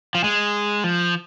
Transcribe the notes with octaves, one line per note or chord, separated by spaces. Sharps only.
F3
G#3
F3